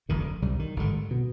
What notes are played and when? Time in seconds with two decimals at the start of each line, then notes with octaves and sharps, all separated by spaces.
0.09 F1 F2 D3 D#3
0.20 D3
0.42 C2 C3 G3
0.59 D#3
0.76 G#1 G2 D3
1.11 B2